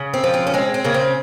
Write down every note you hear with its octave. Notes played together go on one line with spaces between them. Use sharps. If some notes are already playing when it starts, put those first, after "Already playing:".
Already playing: C#3
C4
F3
C4
C#4
G#3 C4
C4
C#3 A#3
C4